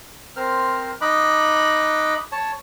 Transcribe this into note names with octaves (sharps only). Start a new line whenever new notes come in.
C4 A#4 C5 F6
D#4 D#5 B5 D6 F#6
C#5 A5